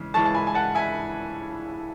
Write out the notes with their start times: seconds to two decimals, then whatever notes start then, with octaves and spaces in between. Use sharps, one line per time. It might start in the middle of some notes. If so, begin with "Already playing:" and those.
Already playing: C#3 E3 G#3
0.14 C#3 E3 G#3 A5 C#6
0.25 A5
0.35 G#5 B5
0.47 G#5
0.55 F#5 A5
0.75 E5 G#5